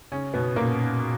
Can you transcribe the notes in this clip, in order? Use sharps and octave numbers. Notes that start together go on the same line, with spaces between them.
C#3 C#4
B2 B3
A#2 A#3